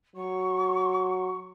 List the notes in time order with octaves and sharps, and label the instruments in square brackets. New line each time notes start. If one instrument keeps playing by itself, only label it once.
[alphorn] F#3 [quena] C#6